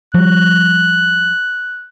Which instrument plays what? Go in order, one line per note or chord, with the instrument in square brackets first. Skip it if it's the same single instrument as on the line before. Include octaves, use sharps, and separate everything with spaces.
[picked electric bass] F3 G3 [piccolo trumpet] F#6